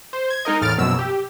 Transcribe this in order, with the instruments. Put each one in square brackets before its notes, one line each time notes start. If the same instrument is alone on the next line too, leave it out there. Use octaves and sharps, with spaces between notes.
[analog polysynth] C5
G#6
G#3 D#4 A#4 D#5
E2 A2 F6 A6 D7
A#1 F#2 B2 E6
G4